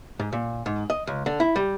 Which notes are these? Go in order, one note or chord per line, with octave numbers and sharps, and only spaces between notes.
G#2
A#2
G#2
D#5
C#2
D3
E4
G3